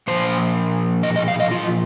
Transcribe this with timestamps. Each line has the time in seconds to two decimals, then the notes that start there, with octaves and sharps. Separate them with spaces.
0.07 A#2 F3 C5
1.03 D#5
1.16 D#5
1.28 F5
1.40 D#5
1.51 F4